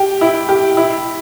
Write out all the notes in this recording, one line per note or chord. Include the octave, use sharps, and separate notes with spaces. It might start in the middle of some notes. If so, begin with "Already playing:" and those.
Already playing: G4
E4
G4
E4